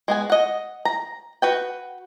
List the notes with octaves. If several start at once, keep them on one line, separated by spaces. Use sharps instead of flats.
G#3 B3 G#5
D#5 F#5
A#5
F#4 B4 G5